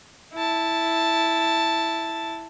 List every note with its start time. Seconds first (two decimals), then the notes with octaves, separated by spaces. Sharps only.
0.33 E4 A5